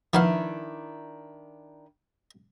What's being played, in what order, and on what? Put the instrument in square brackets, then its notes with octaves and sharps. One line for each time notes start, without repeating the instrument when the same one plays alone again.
[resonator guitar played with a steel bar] D#3 D4 E4 [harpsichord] F3 B3 F5